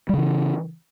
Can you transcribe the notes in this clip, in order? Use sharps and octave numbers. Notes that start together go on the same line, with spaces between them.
C#3 E3 G3